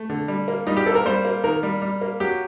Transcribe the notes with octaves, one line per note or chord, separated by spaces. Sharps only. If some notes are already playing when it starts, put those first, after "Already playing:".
Already playing: A3
D3
G3
A#3
G3 D#4
G4
A#3 A4
A#4
G3 C5
A#3
D#3 A#4
G3
G3
A#3
F#3 G4